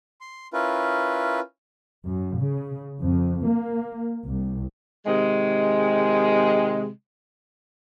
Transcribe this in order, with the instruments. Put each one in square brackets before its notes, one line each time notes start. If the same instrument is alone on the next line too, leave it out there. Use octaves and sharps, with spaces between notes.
[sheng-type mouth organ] C6
C#4 E4 F4 A#4 B4
[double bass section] F#2
C#3
F2
A#3
C2
[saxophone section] C3 D#3 G#3